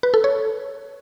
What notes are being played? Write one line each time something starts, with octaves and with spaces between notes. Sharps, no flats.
B4
A4
C#5